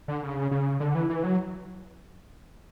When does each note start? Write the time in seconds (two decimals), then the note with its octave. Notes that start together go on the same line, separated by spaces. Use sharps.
0.08 D3
0.23 C#3
0.51 C#3
0.80 D3
0.95 E3
1.10 E3
1.24 F#3